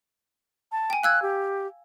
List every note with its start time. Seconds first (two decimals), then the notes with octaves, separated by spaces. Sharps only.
0.72 A5
0.90 G5 G#5
1.03 F5 E6 F#6 G#6
1.22 G4